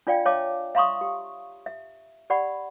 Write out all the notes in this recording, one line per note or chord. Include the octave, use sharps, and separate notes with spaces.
D4 F4 D5 F5 G5
C#5 E5 F5 A5 D6
E5 F5 A#5 C6 C#6 D#6
G4
E5
G4 D5 F#5 B5